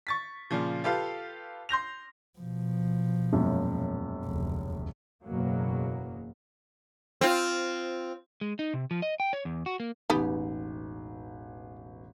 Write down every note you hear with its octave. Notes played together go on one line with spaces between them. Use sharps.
C#6 A6 B6
A#2 C#3 F3
F4 G4 A4 B4 F5
C6 G6 A#6 F7
B2 F3
E1 F#2 A#2
F1 D2
F#1 E2 B2 F#3 A#3
C4 F4
G#3
D#4
C3
F3
D#5
G5
C#5
E2
F#4
A#3
E1 A1 B3 D#4 G4 B4